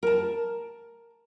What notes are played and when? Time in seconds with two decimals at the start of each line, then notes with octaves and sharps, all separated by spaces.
0.03 A#4 A5